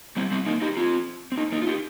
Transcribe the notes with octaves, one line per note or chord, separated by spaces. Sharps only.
G3 C4
G3 C4
A#3 D#4
D#4 G4
C4 F4
C4
A#3 D#4
A#3 D#4
F4
D#4 G4